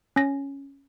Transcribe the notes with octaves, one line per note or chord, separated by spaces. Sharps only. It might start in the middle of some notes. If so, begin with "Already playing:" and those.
C#4 A#6